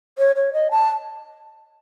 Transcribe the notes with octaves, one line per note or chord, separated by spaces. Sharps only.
C#5
C#5
D#5
A5